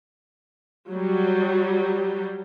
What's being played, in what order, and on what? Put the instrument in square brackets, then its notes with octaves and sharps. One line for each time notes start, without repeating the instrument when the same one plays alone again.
[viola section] F#3 G3